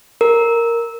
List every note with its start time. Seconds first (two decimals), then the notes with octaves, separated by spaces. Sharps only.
0.21 A#4